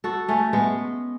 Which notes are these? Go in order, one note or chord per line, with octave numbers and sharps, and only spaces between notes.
F#4 A4
A3 C#4
G#3 B3